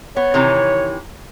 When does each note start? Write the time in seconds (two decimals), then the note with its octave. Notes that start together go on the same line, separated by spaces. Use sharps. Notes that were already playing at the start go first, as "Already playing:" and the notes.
0.17 B3 C#5
0.34 C3 D#3 E3